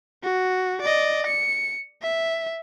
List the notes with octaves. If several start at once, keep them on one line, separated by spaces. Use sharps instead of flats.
F#4
D5 D#5
C#7
E5